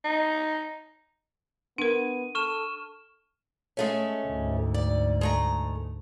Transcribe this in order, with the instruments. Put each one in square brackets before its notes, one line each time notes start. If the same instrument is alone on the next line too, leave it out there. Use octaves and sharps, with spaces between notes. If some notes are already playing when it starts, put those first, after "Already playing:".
[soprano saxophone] D#4
[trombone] B3 [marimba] D4 A#4 [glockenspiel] D#7
[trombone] A4 [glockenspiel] C#6 F6 E7
[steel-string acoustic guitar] G#3 A3 C#4
[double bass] D2 G#2
[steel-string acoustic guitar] D5
G#3 A3 A#5